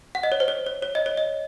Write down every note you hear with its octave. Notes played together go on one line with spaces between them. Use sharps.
F#5
D#5
C#5
C5
C#5
C#5
C#5
D#5
C#5
D#5